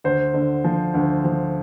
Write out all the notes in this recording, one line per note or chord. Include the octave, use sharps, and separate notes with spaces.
D2 C5
D3
F3
D2
F3